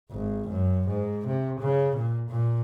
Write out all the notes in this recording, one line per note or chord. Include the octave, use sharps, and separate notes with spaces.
G#1
F#2
G#2
C3
C#3
A#2
A#2